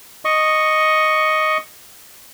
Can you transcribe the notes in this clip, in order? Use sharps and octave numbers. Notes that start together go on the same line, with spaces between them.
D#5 C#6